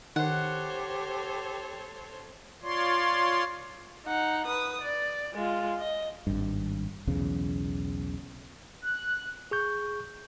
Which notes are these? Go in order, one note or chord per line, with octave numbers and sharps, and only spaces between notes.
D#3 G4 A4 C5 C#5 F#5
F4 C#5 D5 C6
D#4 F#5
B4 D#6
D5
G#3 F4
D#5
G#1 G2
B1 E2 C#3
F#6
G#4 C#6 G6